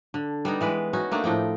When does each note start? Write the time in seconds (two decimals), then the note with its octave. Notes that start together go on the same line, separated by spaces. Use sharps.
0.14 D3
0.45 G3 B3 D#4
0.61 E3 G#3 B4
0.93 C#4 D#4 F#4
1.12 A3 A#3 D4 D#4
1.24 A2 F3 D#4 G5